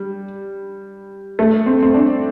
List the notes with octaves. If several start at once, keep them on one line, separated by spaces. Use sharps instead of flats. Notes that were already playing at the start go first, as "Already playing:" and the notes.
Already playing: G3
A3
C4
C4
D4